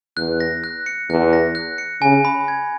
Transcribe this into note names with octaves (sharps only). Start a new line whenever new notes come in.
E2 F#6
A#6
F#6
C#7
E2 F#6
A#6
F#6
C#7
C#3 G#5
B5
G#6